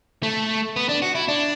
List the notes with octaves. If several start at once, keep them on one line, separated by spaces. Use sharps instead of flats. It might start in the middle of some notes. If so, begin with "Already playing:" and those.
A3
B3
D4
F#4
E4
D4